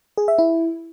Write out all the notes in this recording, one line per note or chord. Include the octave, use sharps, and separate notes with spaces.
G#4
E5
E4